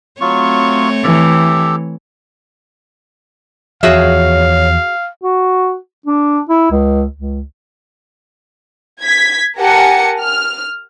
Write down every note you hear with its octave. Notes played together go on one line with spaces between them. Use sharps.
F#3 A3 C4 F4 C#5 C#6
E3 G4 A4
E2 F3 F#4 G#4 C#5 E5 F5
F#4
D4
E4
C#2
C#2
G#6 B6
G4 A#4 F#5 G#5 A5 C#7
F6